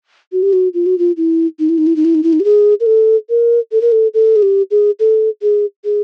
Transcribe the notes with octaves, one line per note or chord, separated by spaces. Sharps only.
F#4
G4
F#4
F4
F#4
F4
E4
D#4
E4
D#4
E4
D#4
E4
D#4
E4
D#4
G4
G#4
A#4
A4
A#4
A4
A#4
A4
A4
G#4
G4
G#4
A4
G#4
G#4